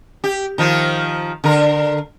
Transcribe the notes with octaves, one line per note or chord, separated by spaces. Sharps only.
G4
D#3 F3 F4
D3 A#4